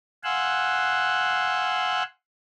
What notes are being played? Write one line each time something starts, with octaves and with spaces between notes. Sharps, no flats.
F5 F#5 G#5 C6 E6 F#6